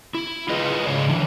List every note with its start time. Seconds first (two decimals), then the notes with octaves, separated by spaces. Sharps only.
0.15 E4
0.49 F4 G#4 B4 D#5
0.86 G#2 C#3 C#5
1.09 D3 E3